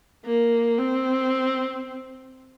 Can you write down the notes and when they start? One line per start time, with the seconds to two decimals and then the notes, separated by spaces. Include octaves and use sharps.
0.25 A#3
0.79 C4